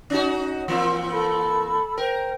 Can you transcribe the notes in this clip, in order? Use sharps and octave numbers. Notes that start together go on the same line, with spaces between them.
C#4 D#4 F#4
E3 A#3 C4
A4 B5 E6
A#4 C5 G5